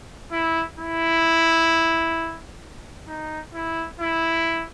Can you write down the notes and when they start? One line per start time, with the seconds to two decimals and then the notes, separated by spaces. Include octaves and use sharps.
0.32 E4
0.78 E4
3.08 D#4
3.54 E4
4.00 E4